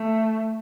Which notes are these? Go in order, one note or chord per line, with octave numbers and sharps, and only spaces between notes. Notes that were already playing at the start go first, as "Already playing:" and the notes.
Already playing: A3